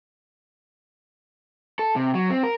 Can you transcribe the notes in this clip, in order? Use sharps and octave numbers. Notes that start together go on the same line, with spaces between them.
A4
C3
F#3
C4
A#4